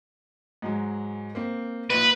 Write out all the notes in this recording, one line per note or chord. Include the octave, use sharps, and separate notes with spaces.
G#2 F#3 G#3
A#3 C4
A#1 D#4 F4 B4